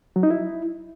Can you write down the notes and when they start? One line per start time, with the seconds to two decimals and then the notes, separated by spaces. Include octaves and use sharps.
0.16 F#3
0.23 D#4
0.30 E4